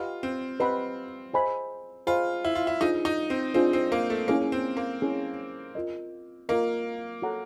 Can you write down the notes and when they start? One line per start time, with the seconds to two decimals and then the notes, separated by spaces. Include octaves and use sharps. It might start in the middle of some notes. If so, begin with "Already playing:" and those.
Already playing: F4 G4 B4 D#5 F#5 B5
0.23 C4
0.60 C4 G4 B4 D#5 F#5 B5
1.33 G#4 C5 D#5 G#5 B5
2.07 F4 G#4 C5 D#5 G#5 B5
2.44 E4
2.55 F4
2.67 E4
2.81 D4 D#4 F4 G#4 C5 D#5
3.05 D#4
3.30 C4
3.54 C4 D4 F4 G#4 C5 D#5
3.73 C4
3.92 A#3
4.10 A3
4.28 A#3 C#4 E4 G#4 C#5
4.52 C4
4.77 A#3
5.02 C#4 E4 G#4 C#5
5.75 F4 A#4 D#5
6.49 A#3 F4 A#4 D#5
7.22 F#4 A4 C#5 F#5 A#5